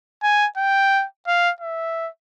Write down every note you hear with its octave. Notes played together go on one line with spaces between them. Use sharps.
G#5
G5
F5
E5